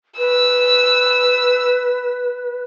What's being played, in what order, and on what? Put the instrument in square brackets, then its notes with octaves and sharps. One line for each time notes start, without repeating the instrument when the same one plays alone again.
[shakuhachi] B4 [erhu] E6